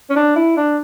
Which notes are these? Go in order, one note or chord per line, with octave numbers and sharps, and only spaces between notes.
C#4
D4
E4
D4